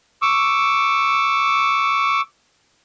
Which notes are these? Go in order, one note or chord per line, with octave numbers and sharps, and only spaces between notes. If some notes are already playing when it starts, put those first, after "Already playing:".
C#6 D6 E6